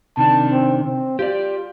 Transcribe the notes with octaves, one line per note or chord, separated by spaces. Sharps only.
C3 D#3 D4 A5
C4
C4
F4 G4 D5